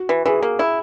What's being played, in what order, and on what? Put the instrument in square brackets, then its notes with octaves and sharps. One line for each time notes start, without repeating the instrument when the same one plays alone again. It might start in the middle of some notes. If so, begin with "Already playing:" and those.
Already playing: [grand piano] F#4
[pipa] E3
[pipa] E3 [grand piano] G#4
[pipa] A#3
E4